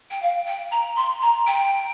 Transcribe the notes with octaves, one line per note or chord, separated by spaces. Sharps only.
G5
F5
G5
A#5
C6
A#5
G5